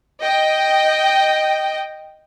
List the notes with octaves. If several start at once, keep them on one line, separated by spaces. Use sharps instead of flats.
D#5 G5